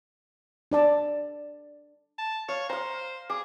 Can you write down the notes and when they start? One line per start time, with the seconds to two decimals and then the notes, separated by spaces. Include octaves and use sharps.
0.71 D4 D5 A5
2.19 A5
2.49 C#5 F5
2.69 C5 F5 A#5
3.30 G#4 D6